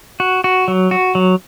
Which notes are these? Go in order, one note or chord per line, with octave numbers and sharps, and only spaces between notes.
F#4
F#4
F#3
F#4
F#3